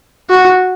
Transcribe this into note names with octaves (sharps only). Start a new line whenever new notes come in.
F#4